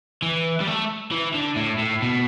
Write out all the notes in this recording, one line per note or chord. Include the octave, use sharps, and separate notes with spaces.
E3
G3
A3
E3
D3
A2
A2
B2